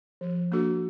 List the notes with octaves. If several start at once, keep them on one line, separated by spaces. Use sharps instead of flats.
F3
A#3 D4 F#4 A4